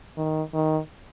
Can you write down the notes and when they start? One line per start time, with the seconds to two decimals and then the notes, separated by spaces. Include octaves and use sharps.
0.17 D#3
0.54 D#3